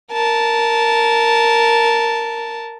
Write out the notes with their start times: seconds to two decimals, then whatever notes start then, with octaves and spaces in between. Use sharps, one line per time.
0.12 A#4 A5